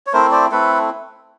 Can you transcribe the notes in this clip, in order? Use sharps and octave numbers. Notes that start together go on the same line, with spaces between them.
C#5
A3 C4 E4 A#4 C5
C5 D5
A3 C4 E4 A4 B4